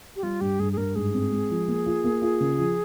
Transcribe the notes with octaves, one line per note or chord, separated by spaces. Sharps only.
G4
G3 F4
G2 G4
G2 G#4
G#4
G2 A#4
G#2 G#4
C4
G#3
F3
A#3
F4
A#3
F4
C#3
F3